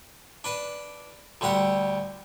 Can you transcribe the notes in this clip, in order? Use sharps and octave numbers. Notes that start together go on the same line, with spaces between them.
D4 B4 A5
D2 D3 G3 G4 F#5